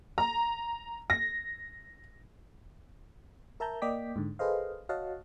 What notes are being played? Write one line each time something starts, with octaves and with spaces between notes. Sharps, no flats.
A#5
A#6
A#4 E5 A5 A#5 G6
A#3 D5 D#5 G5 D6 B6
G#2 D3
G#4 A4 B4 C5 D#5 F5
F#4 C#5 D#5 F5 F#5 A5